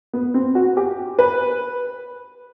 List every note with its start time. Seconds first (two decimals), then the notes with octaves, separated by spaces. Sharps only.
0.13 B3
0.34 C4
0.55 F#4
0.77 G4
1.19 B4